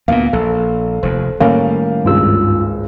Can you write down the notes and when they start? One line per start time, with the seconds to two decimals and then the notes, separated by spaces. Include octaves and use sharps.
0.08 D2 A#2 A#3 B3 F5
0.33 A#1 A4
1.03 F1 D#2 C5
1.40 A2 D#3 G3 A#3 C#4 A#4 F5
2.05 G#1 C#2 G2 F4 E6